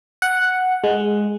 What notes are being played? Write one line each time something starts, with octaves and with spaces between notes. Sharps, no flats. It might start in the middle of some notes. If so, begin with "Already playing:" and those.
F#5
G#3